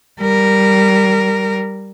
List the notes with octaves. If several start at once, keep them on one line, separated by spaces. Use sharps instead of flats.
G3 A#4